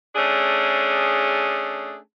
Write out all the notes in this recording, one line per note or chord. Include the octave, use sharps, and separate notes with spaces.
A3 C#4 D4 G#4